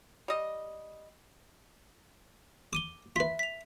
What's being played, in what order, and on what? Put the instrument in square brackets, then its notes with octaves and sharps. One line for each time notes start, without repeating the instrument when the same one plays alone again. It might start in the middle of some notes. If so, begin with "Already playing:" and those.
[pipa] G3 D#5
[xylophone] D6 D#7 G7 [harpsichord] D#6
[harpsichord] F4 B4 [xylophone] E5 B6
[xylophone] B6 F7